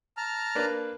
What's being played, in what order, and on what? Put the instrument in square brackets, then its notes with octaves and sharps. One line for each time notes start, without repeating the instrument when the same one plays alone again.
[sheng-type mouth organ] A5 A#5 F6
[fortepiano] A#3 D4 B4